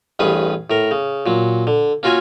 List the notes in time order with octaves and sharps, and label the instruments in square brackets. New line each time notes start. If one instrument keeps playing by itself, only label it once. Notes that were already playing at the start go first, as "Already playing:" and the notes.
[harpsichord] A1 G2 C#4 G#4 B4
A2 A#4
C#3
A#2 F#3
D3
A#3 C#4 F4 F#4 E5 G#5